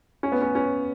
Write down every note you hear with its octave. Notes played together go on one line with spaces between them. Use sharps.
C#4
B3
C#4
C#4